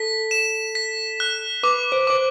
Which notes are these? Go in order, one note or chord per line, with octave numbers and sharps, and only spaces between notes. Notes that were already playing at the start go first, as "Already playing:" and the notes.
Already playing: A4 B6
E7
B6
F#6
B4 D6
C5
C5 D6